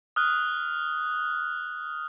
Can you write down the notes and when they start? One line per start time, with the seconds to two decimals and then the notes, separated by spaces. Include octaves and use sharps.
0.16 D#6 F6 F#6